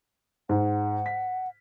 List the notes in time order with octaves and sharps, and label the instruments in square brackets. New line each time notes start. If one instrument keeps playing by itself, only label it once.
[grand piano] G#2 [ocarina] F#5
[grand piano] B6